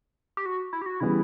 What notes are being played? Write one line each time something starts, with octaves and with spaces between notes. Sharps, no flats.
G4
F#4
E4
G4
F#4
C#3 E3 G3 B3 E4